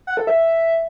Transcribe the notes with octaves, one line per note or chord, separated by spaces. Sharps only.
F#5
A4
E5